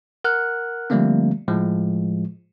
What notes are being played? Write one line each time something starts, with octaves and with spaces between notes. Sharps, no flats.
A#4 F#5 F6 F#6
D3 F3 G3 A3 A#3 C4
A2 F3 G#3